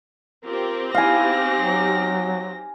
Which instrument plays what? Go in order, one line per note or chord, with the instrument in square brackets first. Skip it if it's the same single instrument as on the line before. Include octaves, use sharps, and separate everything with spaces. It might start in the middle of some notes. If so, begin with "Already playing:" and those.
[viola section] C4 G4 [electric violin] F4 A#4
[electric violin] D#4 A#6 [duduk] E4 [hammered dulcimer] F5 G#5
[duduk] F#3